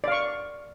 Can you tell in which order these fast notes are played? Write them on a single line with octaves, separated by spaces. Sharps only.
D5 F5 C#6